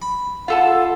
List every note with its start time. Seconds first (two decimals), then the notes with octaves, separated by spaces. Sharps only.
0.02 B5
0.48 F4 A4 F5 F#5 A5